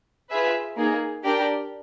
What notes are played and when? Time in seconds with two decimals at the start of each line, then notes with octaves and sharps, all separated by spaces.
0.30 F4 G#4 B4 E5
0.77 A#3 D#4 G#4
1.24 D4 G4 A#4 D5 G5